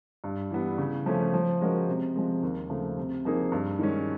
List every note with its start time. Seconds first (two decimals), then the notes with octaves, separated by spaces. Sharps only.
0.24 G2
0.51 E3 G3 B3
0.78 C#3
1.06 F3 A3 C#4
1.34 F3
1.61 G#3 C#4 F#4 A#4
1.88 C3
2.16 F3 G#3
2.43 D#2
2.70 C#3 F3 A3
2.97 C3
3.25 F3 A#3 D#4 G#4
3.52 G2
3.79 D#3 G#3 C#4